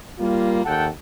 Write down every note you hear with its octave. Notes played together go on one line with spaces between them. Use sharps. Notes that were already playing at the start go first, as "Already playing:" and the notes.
G3 A#3 F4
D#2 A4 F#5 G5 A5